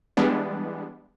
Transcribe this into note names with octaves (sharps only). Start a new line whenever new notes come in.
E3 G3 G#3 B3 D4